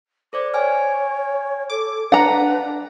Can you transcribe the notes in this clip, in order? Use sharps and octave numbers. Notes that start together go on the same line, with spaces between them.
A4 C5 D5 D6
C#5 G5 G#5 F6
A4 D6
D4 B4 F#5 A5 A#5